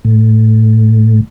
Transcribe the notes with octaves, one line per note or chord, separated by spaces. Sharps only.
A2